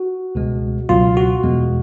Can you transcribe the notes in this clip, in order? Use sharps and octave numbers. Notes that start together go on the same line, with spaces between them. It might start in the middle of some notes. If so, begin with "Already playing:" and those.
Already playing: F#4
C#2 B2 G#3
C#2 B2 F#3 F4
F#4
E2 B2 G#3